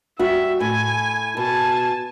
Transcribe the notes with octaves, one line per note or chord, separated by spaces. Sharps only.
G3 F#4 E5
A2 G#5
B2 G#5 A5